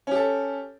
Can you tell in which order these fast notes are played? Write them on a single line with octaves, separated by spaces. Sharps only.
C#4 G4 A4